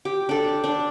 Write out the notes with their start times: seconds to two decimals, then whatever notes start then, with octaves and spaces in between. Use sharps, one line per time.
0.05 G4
0.29 D4 A4
0.64 D4